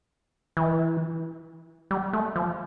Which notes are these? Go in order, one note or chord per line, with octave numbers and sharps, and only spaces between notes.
E3
G3
A3
F3